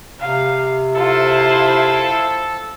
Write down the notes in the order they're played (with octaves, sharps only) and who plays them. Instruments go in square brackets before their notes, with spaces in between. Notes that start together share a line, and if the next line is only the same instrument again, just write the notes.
[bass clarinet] C3 [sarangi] F5
[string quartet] E4 C5 [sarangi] F4 [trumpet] A4